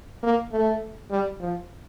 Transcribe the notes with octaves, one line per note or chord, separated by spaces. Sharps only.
A#3
A3
G3
F3